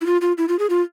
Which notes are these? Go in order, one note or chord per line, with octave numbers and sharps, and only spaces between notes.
E4
F4
F4
E4
F4
G#4
F4